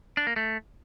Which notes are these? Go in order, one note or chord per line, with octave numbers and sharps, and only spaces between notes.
D4
A#3
A3